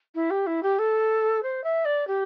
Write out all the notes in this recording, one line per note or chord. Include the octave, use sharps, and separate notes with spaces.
E4
G4
E4
G4
A4
C5
E5
D5
G4